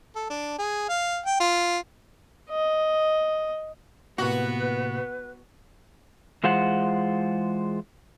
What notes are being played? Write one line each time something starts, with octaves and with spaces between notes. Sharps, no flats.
A4
D4
G#4
F5
G5
F4
D#5
A2 C3 A#3 B3 F#4 B4
E3 G#3 F4 C5 F#5